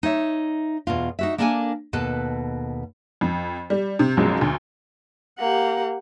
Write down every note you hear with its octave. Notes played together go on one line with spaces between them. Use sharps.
D#4 C#5 E5
E2 B2 F4
D#4 F#4 E5
A#3 D4 A4 A#4 G5 G#5
D#2 B2 A4 B4
F2
G3
C3
B1 F#2 F3 F#3 G#3
D2
A#3 G4 F#5